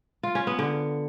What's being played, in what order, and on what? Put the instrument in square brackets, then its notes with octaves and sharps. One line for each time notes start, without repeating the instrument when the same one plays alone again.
[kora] F4
C#4
B3
D3